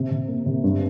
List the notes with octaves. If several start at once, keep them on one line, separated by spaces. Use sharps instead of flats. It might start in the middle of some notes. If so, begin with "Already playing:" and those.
Already playing: C3
C3
A#3
C3
G2